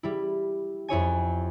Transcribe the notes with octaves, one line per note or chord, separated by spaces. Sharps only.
G3 E4
F2 E4 C#5 G#5